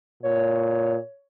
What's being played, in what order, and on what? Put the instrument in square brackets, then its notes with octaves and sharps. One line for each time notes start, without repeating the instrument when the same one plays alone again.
[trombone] A#2 [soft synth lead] C#5